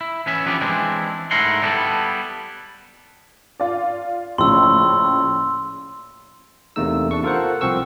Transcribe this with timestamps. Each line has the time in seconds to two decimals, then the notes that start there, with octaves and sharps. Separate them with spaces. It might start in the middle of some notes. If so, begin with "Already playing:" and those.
0.01 E4
0.26 E3 B3 C#4 E5
0.46 F3 B3 C#4 D4 G4
0.61 E3 G#3 C4 D4 E4
1.31 G#2 A3 E4 A#4 F#5 C6
1.62 D3 G3 B3 E4 A4
3.60 F4 D5
4.38 A#1 A2 C#3 C6 E6
6.76 E2 C3 A3 A#3 D#4 E6
7.11 D4 C#6
7.23 F4 A4 A#4 C5 F#5
7.61 C2 F3 C4 C#6 E6